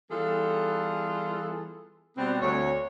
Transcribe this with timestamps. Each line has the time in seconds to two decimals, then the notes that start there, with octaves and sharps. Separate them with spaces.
0.11 E3 G3 B3 F4 G#4 A4
2.17 B2 G3 B3 C4
2.41 D2 C#5